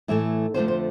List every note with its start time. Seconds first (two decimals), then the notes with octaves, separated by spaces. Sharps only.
0.08 A2 E3 A3 E5
0.54 F2 D3 F3 A3 C5
0.68 C5